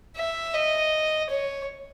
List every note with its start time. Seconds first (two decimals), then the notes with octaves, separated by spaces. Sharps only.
0.16 E5
0.54 D#5
1.29 C#5